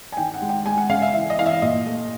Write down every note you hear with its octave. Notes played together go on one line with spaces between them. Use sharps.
G#5
D#3 G5
F#5
G#3
G5
G#3 G#5
F#5
C#3 F5
E5
E3 E5
D#5
E3 F5
E5
A#2 D#5
A3